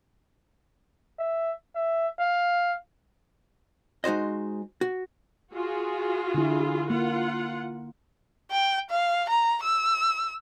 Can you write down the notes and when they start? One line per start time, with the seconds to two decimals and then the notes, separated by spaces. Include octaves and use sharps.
1.19 E5
1.75 E5
2.20 F5
4.04 G#3 D#4 F#4 C5 D#5
4.81 F#4
5.54 F4 F#4 G#4
6.34 D3 E4
6.90 A#3 F4 F#5
8.51 G5
8.90 F5
9.30 A#5
9.63 E6